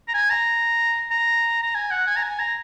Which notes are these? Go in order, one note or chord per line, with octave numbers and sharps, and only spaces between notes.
A#5
G#5
A#5
A#5
A#5
G#5
F#5
G#5
A#5
G#5
A#5